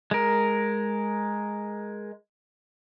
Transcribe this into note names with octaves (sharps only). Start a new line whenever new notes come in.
G#3 A#4